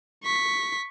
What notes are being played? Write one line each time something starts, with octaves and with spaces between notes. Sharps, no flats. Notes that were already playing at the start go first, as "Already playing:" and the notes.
C#6 B6